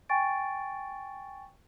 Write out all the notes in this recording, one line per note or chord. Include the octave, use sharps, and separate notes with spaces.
G5 G#5 C#6 A6 D7